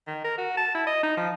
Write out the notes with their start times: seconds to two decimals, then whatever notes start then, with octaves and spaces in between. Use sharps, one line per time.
0.07 D#3
0.24 A#4
0.38 F#4
0.57 A5
0.75 E4
0.87 D#5
1.03 D#4
1.17 F3